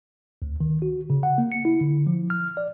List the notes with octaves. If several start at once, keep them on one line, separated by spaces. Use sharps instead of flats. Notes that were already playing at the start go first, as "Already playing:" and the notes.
D2
D#3
F#4
C#3
F#5
A#3
C#7
E4
D3
F3
F6
D5